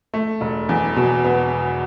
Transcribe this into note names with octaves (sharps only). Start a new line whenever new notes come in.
A3
E1
E2
B2
B3